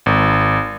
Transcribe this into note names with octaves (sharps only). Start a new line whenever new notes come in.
G#1